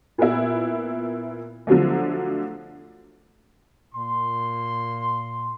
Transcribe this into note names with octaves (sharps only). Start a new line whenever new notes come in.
A#2 B3 E4
D3 F3 F#3 A3
A#2 C6